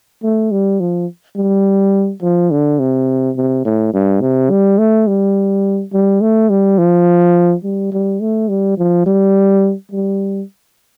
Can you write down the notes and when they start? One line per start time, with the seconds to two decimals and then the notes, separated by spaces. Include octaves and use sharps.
0.23 A3
0.51 G3
0.80 F3
1.36 G3
2.22 F3
2.51 D3
2.79 C3
3.36 C3
3.65 A2
3.93 G2
4.21 C3
4.50 G3
4.79 A3
5.07 G3
5.93 G3
6.21 A3
6.49 G3
6.78 F3
7.64 G3
7.92 G3
8.20 A3
8.49 G3
8.78 F3
9.06 G3
9.91 G3